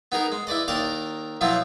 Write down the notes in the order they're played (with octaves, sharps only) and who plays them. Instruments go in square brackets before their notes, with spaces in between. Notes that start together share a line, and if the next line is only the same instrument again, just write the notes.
[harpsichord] B3 D#4 G#4 A#4
G#3
E4 B4 D5 D#5
D#2 A#4 D5 D#5 A5 A#5
B2 F3 F#3 E4 F4